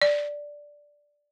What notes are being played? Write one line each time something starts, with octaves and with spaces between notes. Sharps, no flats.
D5